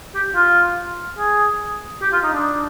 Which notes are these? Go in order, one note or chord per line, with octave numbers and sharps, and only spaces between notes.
G4
F4
G#4
G4
F4
D#4
D4